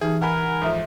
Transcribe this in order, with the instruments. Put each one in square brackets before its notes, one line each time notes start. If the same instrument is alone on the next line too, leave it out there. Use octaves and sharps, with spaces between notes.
[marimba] E3 [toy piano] D#4 G4 B4 [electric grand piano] G#4
[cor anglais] A#4 [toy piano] B4 [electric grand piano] F#5 G#5 B5
[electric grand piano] G#2 F3 [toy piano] A4 E5 D#6